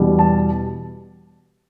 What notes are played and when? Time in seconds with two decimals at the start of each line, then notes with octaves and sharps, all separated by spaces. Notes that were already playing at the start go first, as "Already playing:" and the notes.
Already playing: E2 B2 G3
0.19 A5